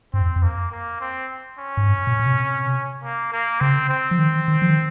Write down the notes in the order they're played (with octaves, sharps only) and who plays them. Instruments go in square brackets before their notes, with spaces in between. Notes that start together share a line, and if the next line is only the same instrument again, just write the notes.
[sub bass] G2 [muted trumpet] C4
[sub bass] F2
F2
[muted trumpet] A#3
A#3
C4
C#4
[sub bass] G#2
G2
A#2
A#2
C3
[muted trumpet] A#3
A#3
[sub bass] C#3 [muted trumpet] C4
[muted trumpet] C4
[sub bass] F3
D#3
D#3
F3
D#3